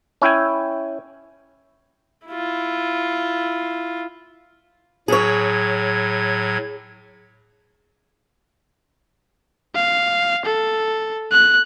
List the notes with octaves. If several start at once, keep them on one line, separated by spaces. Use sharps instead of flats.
C#4 E4 G5 G#5
E4 F4
A2 F#3 G#4 C#5 G#6
F5
A4
F#6